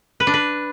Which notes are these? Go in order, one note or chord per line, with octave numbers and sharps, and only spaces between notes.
B4
D4
B4